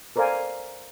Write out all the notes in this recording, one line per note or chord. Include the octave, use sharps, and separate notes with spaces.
A4 A#4 C5 D5 F5 G#5